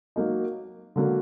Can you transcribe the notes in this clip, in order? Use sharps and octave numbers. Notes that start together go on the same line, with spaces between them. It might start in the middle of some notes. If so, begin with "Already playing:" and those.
F#3 A#3 D#4
D3 F#3 A#3